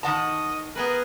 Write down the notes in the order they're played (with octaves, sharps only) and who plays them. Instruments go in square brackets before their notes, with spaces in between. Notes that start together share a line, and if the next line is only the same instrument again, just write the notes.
[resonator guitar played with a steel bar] D#3 F#5 A5 [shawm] D#5
[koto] B3 G#4 B4 [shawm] A#4